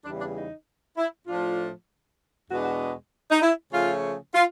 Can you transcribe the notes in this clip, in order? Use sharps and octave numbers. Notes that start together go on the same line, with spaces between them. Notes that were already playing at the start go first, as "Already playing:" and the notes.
E2 C#3 E3 G3 D4
D4
D#4
E4
A2 F3 A3 D4 F4
E2 B2 G#3 B3 D4 F#4
F#4
D#4
E4
C#3 F3 A3 C#4 F4
F4